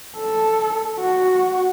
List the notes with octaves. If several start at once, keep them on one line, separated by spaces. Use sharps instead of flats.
A4
F#4